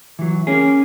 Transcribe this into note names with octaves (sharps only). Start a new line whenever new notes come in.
E3 F#3
A#3 C#4 G#4